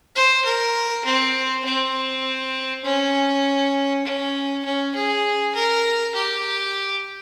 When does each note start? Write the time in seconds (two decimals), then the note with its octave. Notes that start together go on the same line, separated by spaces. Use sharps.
0.15 C5
0.45 A#4
1.05 C4
1.65 C4
2.84 C#4
4.04 C#4
4.64 C#4
4.95 G#4
5.54 A#4
6.14 G4